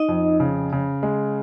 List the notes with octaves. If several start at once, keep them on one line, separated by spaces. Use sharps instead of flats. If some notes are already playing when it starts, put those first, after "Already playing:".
Already playing: D#4 D#5
F2
C#3
C#3
G#3